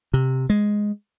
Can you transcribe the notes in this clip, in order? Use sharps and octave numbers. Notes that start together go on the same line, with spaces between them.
C3
G#3